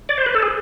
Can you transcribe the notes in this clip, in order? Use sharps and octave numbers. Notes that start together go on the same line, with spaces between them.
D5
C5
B4
A4
G#4